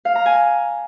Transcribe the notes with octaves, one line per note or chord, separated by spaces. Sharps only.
F5
A#5
G#5